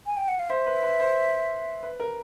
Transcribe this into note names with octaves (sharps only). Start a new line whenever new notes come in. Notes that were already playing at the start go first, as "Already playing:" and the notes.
G#5
G5
F#5
F5
C5 E5
B4
B4
C5
B4
A#4